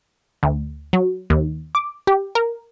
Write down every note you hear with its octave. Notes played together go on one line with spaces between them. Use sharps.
D2
F#3
D#2
D6
G4
A#4